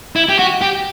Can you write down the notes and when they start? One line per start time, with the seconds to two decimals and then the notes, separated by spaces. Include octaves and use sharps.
0.16 E4
0.29 G4
0.39 F#4
0.61 G4